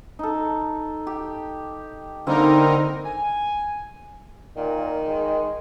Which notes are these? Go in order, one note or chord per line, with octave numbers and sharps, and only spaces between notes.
D#4 A4
G4
D3 G3 A#3 C4 D#4 A#4
G#5
A#2 D#3
G#3